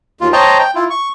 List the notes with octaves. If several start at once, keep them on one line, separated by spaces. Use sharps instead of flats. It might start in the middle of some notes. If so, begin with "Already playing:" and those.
D#2 F4
C5 C#5 D#5 G5 A5 A#5
G5
E4 F4
C#6